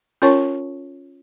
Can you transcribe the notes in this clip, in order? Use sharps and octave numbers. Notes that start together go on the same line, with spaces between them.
C#4 F4 A#4 C#5 A5 C#6